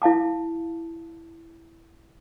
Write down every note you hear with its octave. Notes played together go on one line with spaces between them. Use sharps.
E4 F5 A5 D6